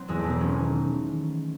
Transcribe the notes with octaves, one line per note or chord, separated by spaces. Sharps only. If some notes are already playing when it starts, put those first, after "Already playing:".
Already playing: F#3 C4
E2 G#3
E1 A3
C4
E1 C#4
D#3